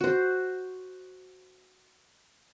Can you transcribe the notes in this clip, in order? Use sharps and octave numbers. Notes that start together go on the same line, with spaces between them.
F#4 C5